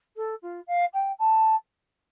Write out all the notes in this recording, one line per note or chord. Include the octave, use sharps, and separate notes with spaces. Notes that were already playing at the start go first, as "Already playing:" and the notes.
A4
F4
F5
G5
A5